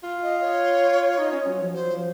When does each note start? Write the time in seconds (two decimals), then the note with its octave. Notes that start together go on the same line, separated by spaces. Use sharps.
0.03 F4
0.23 D#5
0.41 C#5
1.18 D#4
1.32 C#4
1.46 F#3
1.60 F3
1.74 F#3 C5
1.93 F3